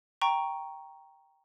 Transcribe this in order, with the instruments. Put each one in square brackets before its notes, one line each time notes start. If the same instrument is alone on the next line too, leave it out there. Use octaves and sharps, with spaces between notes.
[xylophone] G5 A#5 C#6